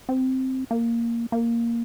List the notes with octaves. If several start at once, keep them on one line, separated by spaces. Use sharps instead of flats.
C4
A#3
A#3